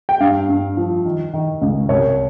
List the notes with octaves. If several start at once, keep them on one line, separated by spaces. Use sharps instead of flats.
G5
G2 F5
G2
F3
D#3
D#3
C#2
C2 C#5